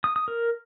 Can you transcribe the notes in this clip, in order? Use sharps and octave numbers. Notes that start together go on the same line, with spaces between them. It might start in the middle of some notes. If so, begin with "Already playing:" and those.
D#6
D#6
A#4